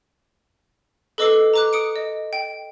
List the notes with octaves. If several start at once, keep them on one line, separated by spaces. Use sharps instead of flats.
A4 B4 D#5 D6 E6 C7
A#5 D6 F#6
D#6 C#7 D7
D#5
G5